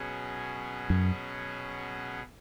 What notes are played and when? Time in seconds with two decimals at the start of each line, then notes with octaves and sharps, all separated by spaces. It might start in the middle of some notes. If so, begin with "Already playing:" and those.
Already playing: B2 F#3 C#4 G#4
0.90 F#2